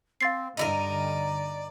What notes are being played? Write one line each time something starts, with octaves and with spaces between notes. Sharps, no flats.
C4 F5 A6 C7
G2 D3 D#4 E4 A#4 D5